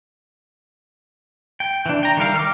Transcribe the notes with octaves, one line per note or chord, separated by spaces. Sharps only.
G5
E3 D4
G5 A#5
D#3 G3 A#4 F5
D6 F6